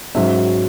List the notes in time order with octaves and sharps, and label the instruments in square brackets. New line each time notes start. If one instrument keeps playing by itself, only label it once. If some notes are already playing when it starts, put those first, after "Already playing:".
[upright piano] G#2 F#3 C#4 E5